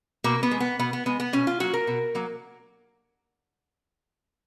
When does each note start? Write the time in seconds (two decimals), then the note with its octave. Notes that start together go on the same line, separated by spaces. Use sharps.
0.24 B2 A#3
0.43 B3
0.51 G#3
0.60 B3
0.79 B2 B3
0.93 B3
1.06 G#3 B3
1.20 B3
1.33 B2 C#4
1.47 F4
1.60 F#3 A#3 F#4
1.74 A#4
1.87 B2
2.15 F#3 A#3